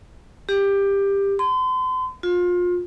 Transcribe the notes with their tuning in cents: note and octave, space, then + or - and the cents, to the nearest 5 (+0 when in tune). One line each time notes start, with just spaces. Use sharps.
G4 +15
C6 -40
F4 +30